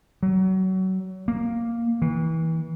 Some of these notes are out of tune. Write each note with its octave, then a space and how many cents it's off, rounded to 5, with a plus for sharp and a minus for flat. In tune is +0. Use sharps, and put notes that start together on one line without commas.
F#3 +30
A#3 +0
E3 -30